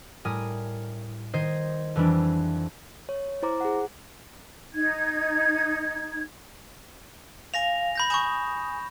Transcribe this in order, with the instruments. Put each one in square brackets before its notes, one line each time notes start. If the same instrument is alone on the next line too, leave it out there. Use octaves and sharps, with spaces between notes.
[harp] A2 G3 A#4 G#5 D#6
D#3 C5 D#5 G6 G#6 C7
F2 E3 G3 D4
[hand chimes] C#5
E4 C5 A#5 D6
G#4 F#5
[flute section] D#4 G#6
[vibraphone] F5 G#5 [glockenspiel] A#6 F7
[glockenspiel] B5 G6 A#6
[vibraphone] G#5 D#6 [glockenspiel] C#6 G6 E7